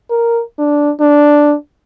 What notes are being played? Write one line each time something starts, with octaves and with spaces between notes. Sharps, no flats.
A#4
D4
D4